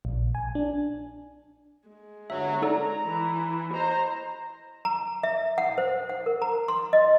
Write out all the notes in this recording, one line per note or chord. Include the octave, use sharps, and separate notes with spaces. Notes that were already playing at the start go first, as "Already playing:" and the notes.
A#1
G#5
D4
G#3
G1 F#3 E5
D#4 A4 D5 A#5
E3
C5 D#5 A#5
A#5
E5
F#5
C5
F#5
A#4
A#5
C6
D#5